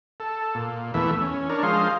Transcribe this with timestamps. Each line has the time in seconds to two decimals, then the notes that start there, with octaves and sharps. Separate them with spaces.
0.20 A4
0.55 A#2
0.94 E2 E3 A3 E5
1.21 C#4
1.49 D4 A#4 C#5
1.63 F3 G#3 C5 D#5 F5